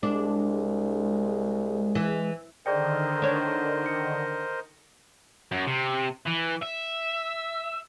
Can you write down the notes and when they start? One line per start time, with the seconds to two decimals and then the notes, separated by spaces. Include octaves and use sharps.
0.03 C2 G#3 D4
1.95 E3
2.66 D3 D#3 G#4 A#4 C5 D5 D#5 G5
3.22 D4 C#5
3.85 A#6 C#7
5.51 F#2
5.67 C3
6.26 E3
6.62 E5